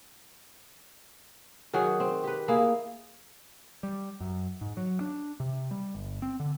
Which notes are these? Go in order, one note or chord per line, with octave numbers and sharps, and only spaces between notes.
D#3 F#3 F#4 G#4
C4
G4 B4
A#3 E4 G#4
G3
F#2
G#2
F#3
D4
C3
G3
G1
C4
D3